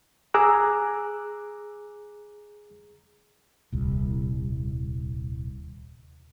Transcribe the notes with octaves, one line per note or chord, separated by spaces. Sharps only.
G#4 A#5 D6 E6 F#6
D#1 C2